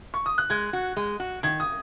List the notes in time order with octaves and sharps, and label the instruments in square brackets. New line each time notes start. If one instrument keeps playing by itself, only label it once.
[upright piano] C#6
D#6
F#6
[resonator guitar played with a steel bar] G#3 [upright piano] G#6
[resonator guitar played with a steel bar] F#4
G#3
F#4
[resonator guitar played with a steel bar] D#3 [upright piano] G#6
[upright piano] D#6